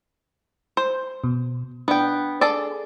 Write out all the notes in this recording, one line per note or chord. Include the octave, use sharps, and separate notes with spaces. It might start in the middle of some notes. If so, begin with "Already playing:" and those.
C5
B2
B3 D4 G5
G#4 A4 D5